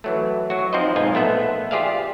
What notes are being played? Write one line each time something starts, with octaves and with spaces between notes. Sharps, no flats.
E3 F#3 A3
F#3 F#4
F3 C4 D#4 C5 D#5
B1 G#2 F4 D#5 G#5
A#1 A3 B3 E5 F#5
F4 G4 G#4 D5 E5 F5